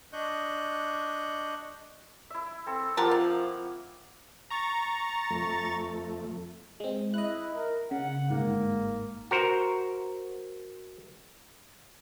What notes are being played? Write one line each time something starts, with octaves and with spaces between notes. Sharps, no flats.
D4 D#5 C#6 F#6 G6
E4 E5
C4 A4
F3 A#3 G4 A#4 F#5 A5
C4
A#5 C#6 A6
F2 A3
G#3 C4
E4 D#5 F#6
A#4
C#3 F#5
G1 G#2 A#3
F#4 A#4 C5